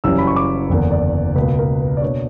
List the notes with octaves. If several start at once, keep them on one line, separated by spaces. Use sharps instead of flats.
F#1 F#2 E3 G3 C#4 E6
B5
C#6
D6
F#1 E2 D3 A#3
D5
C#2 B2 A#3 B4
A#4
B4
D5
B2 A#3 D4 C#5